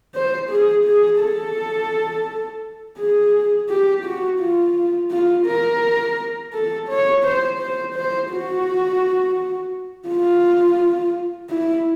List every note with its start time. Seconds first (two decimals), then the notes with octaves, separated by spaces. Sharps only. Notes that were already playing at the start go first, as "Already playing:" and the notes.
0.14 C5
0.50 G#4
0.85 G#4
1.21 A4
2.98 G#4
3.69 G4
4.05 F#4
4.40 F4
5.11 F4
5.47 A#4
6.53 A4
6.89 C#5
7.24 C5
7.60 C5
7.95 C5
8.31 F#4
10.08 F4
11.50 E4